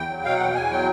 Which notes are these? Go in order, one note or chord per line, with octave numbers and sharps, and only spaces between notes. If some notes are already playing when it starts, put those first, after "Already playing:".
Already playing: E2 G5
F#3
B2 F5
F#5
E2 G5
E2 G#5
F#3 G5